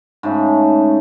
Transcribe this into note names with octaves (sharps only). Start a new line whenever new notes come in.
G#2 C#3 A3